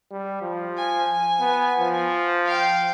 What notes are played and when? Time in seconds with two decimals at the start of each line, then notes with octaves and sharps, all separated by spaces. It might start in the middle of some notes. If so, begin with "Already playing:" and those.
0.11 G3
0.42 F3
0.77 G#5
1.40 B3
1.79 F3
2.46 F5 G5